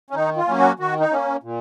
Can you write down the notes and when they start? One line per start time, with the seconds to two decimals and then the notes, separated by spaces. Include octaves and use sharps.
0.10 C#4
0.15 D#3 D#4
0.37 F4
0.47 F#3 A#3 C#4
0.58 F#4
0.79 D#3 F#4
1.00 D#4
1.11 A#3 C#4
1.43 A#2